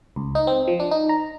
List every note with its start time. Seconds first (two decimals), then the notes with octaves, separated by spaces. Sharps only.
0.16 C#2
0.35 D#4
0.47 C4
0.68 F3
0.80 D4
0.91 D#4
1.09 A#5